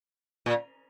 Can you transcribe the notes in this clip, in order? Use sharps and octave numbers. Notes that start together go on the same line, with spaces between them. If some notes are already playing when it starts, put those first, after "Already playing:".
A#2